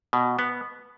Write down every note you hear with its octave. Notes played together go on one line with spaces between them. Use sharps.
B2
B3